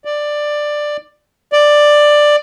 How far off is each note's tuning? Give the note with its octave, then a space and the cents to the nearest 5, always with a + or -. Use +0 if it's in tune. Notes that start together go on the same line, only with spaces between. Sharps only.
D5 +10
D5 +10